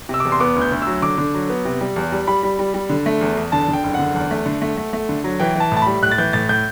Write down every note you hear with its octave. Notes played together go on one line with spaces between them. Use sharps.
C3 E6
E2 D6
C6
B3 D6
D2
G6
D2
F#3 E6
D3 D6
D3
F#3
B3
C3
G3
E2
G3
G3 B5
G3
G3
G3
D3
A3
E2
E2
D3 A5
D3
G5
F#1
F#5
D3
E2
A3
D3
A3
A3
A3
D3
F#3
E3 G5
E3 A5
A2 A5
G3 B5
A2 F#6
A6
E3 G6
A2 A6
A2 G6